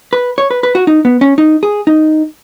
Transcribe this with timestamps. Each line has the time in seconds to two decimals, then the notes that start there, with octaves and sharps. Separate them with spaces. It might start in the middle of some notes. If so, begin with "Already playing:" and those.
0.13 B4
0.38 C#5
0.51 B4
0.63 B4
0.75 F#4
0.87 D#4
1.05 B3
1.21 C#4
1.38 D#4
1.63 G#4
1.87 D#4